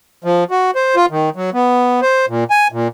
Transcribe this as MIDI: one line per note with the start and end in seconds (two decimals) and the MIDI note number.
0.24 0.44 53
0.51 0.71 66
0.75 0.95 72
0.96 1.06 65
1.11 1.30 51
1.36 1.50 54
1.53 2.00 59
2.02 2.26 72
2.28 2.44 46
2.51 2.68 80
2.72 2.88 46